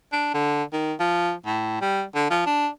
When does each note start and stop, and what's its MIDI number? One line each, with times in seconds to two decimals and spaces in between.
0.12 0.29 62
0.34 0.63 50
0.72 0.93 51
1.00 1.33 53
1.46 1.77 45
1.81 2.03 55
2.15 2.27 50
2.30 2.42 53
2.46 2.68 62